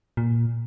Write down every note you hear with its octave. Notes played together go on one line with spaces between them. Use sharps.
A#2